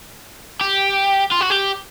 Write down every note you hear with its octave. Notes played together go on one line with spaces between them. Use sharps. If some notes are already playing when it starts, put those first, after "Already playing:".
G4
F4
F#4
G4